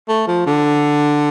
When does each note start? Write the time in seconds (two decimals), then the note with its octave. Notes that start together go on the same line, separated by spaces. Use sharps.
0.09 A3
0.28 F3
0.46 D3